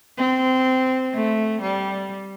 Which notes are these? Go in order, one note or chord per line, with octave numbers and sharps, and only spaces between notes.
C4
A3
G3